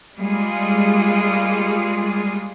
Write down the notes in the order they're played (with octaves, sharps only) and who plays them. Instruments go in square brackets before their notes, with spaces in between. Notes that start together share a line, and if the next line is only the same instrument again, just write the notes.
[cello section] G3 G#3 A#3 F4 G#4